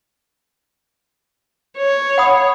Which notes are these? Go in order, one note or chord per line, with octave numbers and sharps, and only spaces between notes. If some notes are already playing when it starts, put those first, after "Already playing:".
C#5
F#5 B5 D#6